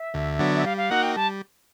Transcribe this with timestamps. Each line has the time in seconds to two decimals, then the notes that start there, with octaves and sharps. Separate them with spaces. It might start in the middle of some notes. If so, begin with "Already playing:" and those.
Already playing: E5
0.14 D2
0.39 D3 F#3 B3 D4
0.55 E5
0.65 G3 F5
0.77 F5
0.90 A#3 D#4 F#4 F#5
1.03 G5
1.16 G3 A5